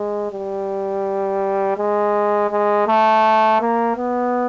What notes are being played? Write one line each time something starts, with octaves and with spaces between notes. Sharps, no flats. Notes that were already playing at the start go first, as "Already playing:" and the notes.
Already playing: G#3
G3
G#3
G#3
A3
A#3
B3